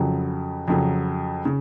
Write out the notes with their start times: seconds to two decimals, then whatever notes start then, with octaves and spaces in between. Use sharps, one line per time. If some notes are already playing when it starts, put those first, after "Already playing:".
Already playing: F2 C#3 F#3
0.68 F2 C#3 F#3
1.45 C#3